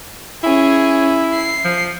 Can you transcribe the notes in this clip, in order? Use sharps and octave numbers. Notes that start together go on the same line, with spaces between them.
C#4 E4 G#4
C7
F3